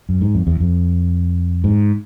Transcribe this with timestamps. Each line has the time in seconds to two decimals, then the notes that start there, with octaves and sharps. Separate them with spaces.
0.09 F#2
0.21 G#2
0.35 F2
0.47 E2
0.60 F2
1.64 G#2